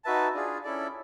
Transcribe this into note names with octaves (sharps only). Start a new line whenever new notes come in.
D#4 F#4 B4 E5 A5
D4 F4 G#4
C#4 E4 A4 D5